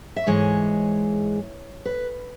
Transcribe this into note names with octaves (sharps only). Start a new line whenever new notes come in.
E5
G#2 E3 G#3 C#5
B4